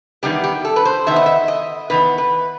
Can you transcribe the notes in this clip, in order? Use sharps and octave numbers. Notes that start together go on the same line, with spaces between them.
E2 D#3 G3 B3 G4
G4
A4
B4
C5
E2 D#3 B3 E5
D#5
E5
D#5
E2 D#3 B3 B4
B4